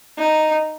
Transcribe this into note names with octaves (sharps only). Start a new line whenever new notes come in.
D#4